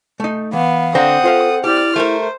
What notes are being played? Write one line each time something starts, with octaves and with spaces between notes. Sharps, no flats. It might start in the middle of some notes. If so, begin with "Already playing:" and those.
A3 D#4
E3 B3 F5
D3 C4 C5 F#5 A#5 D#6
F4 A4 C5 F5
E4 G4 D5 F6
A3 A#4 C5